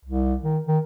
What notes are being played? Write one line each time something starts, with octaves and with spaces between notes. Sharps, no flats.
C2
D#3
D#3